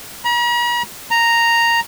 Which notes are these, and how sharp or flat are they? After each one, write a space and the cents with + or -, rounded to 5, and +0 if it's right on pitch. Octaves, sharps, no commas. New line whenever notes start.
A#5 +45
A#5 -5